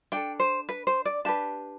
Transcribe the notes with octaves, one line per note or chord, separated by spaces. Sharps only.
D4 A4 G5
C5
B4
C5
D5
D4 G4 B4 A5